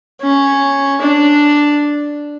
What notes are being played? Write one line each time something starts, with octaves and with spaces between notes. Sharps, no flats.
C#4
D4